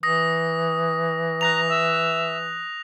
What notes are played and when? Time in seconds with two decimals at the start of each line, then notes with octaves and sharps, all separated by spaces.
0.03 E3 D#6 A#6
1.41 A#5 F#6 A#6 F7
1.68 E5